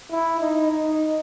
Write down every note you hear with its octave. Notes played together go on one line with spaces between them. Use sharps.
E4
D#4
D#4